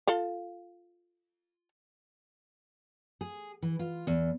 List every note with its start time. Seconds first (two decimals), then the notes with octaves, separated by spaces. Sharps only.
0.07 F4 A4 F5
3.21 G#4
3.62 E3
3.79 F4
4.07 E2